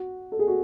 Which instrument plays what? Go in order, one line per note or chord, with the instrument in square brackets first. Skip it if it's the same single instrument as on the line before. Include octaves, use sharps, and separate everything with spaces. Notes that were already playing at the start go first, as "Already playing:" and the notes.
Already playing: [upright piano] F#4
A4
G#4
F#4